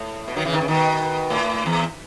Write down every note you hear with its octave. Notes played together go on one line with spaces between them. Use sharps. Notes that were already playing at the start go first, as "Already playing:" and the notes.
Already playing: A2
B2
D#3 F#3
C#3 E3
D#3
C#3
B2 D#3
A2
E2